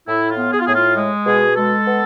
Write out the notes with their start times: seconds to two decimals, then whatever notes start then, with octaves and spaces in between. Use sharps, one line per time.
0.07 A2 E4
0.31 F4
0.37 B3
0.52 G#4
0.59 F4
0.67 A2 G#4
0.75 F4
0.97 G#3
1.26 B2 G#4
1.56 G#3 A4
1.86 B3